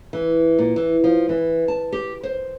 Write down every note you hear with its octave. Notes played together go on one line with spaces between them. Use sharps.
E3
A#2
E3
F3
E3
A5
G4
C5